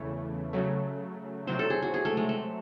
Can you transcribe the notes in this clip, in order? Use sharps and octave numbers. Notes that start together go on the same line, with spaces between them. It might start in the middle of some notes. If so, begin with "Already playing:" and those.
Already playing: E2 C#3 E3 A3 C#5
C#3 F#3 A3
C3 F#3 C4 C5
A4
G#4
F#4
G#4
A3
G#3
A3